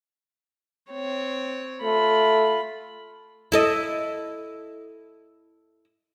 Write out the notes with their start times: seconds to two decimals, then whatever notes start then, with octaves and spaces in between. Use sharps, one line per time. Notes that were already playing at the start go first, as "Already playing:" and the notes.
0.91 C4 C#5
1.83 A3 F4 B5
3.52 E4 A4 D#5